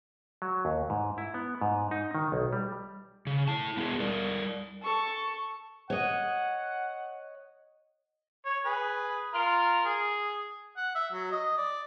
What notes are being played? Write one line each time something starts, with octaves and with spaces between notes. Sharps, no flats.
F#3
D#2
G#2
E4
B3
G#2
D#4
D#3
B1
G3
C#3
E4 A5
G#3 B3 E4 G#4
G3 A#4 D5
A4 C#6
C#5 D#5 F#5
C#5
G#4 B4
F4 A#4
G#4
F#5
E5
F#3
D#5
D5